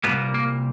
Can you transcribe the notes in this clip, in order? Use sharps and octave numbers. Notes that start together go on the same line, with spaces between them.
C2 A#2 G3 A#3 B3
A#3